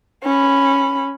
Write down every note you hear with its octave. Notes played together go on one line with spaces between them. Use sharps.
C#4 B5